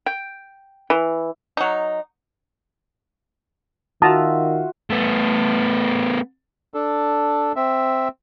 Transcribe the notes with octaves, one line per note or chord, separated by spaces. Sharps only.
G5
E3
F#3 D#4
D#3 F4 F#4 E5 A5 A#5 D#6
A3 B3
D4 A4
C4 E5